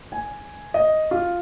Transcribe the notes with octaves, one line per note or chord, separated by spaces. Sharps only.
G#5
D#5
F4